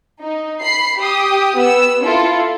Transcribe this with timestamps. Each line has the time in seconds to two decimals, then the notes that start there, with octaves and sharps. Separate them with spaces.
0.21 D#4
0.62 B5 C7
1.00 G4 D#6
1.57 B3 E6
2.04 E4 F4 A4